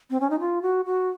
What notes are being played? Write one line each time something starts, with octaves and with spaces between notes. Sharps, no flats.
C4
C#4
D#4
F4
F#4
F#4